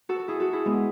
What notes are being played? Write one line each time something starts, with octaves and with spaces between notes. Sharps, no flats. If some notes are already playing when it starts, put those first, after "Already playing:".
F#4 A4
A4
E4 G#4
F#4 A4
E4 G#4
G#3 B3